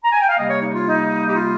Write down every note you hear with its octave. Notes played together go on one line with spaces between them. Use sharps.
A#5
G#5
G5
F5
C3 G3 A#3 D#5
C#5
D#4
F4
D#4
G4
F4